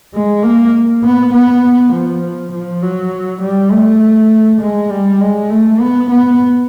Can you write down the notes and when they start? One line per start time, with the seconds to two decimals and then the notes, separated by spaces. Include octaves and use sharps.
0.14 G#3
0.42 A#3
1.03 B3
1.33 B3
1.93 F3
2.52 F3
2.82 F#3
3.42 G3
3.71 A3
4.61 G#3
4.91 G3
5.21 G#3
5.50 A3
5.80 B3
6.10 B3